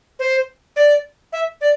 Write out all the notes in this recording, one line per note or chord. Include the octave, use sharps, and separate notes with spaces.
C5
D5
E5
D5